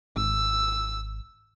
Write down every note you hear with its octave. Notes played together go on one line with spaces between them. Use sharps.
G#1 E6